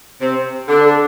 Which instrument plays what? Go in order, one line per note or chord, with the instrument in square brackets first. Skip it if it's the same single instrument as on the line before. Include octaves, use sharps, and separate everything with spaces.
[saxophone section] C3 C4
[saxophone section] D3 D4 [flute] A4